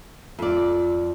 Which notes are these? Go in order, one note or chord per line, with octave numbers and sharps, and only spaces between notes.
F2 D5